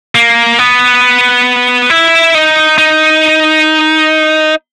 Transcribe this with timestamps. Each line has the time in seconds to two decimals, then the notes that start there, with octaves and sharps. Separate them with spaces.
0.15 A#3
0.59 B3
1.90 E4
2.35 D#4
2.78 D#4